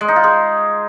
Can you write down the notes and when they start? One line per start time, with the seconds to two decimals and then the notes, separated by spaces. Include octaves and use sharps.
0.01 G#3
0.08 D#4
0.16 F4
0.24 G#4